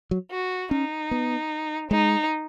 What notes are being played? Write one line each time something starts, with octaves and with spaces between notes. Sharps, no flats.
F#3
F#4
C#4 D#4
B3
G#3 D#4